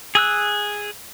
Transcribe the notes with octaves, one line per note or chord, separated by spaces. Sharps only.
G#4 E6 F#6